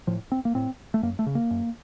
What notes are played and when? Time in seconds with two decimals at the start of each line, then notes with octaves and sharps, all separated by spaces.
0.07 A2 F3
0.32 C4
0.45 A#3
0.55 A2 C4
0.94 A3
1.03 F#2 A#3
1.19 A3
1.26 C#3
1.35 A#3
1.51 F#2